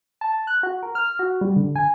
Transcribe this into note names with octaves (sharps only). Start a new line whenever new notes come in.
A5
F#6
F#4
A#4
F6
F#4
G3
D3
G#5